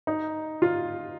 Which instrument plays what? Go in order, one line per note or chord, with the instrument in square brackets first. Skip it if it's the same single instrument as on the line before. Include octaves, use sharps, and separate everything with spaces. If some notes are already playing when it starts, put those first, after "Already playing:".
[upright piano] D#4
F4